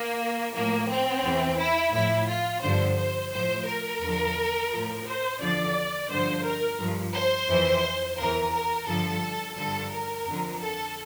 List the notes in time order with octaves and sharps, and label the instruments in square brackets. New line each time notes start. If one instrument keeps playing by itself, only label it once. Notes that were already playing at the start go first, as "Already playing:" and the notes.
Already playing: [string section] A#3
A2 F3 A#3
C4
E2 E3
E4
A2 F3 E4
F4
G2 D3 F3 C5
C5
A2 F3 C5
A#4
E2 D3 F3
A2 F3
C5
E2 D3 F3 D5
G2 D3 F3 C5
A#4
G2 F3
C5
F2 E3
E2 E3 A#4
A#4
G2 D3 F3 A4
G2 D3 F3 A4
A#4
F2 D3 F3
A4